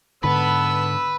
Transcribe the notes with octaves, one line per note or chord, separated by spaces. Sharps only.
G#2 D3 B3 B4 A5 E6